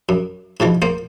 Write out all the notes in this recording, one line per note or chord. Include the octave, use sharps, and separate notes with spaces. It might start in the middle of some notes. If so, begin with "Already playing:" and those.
F#2
G#2 B2 E3 F3
A#3 C5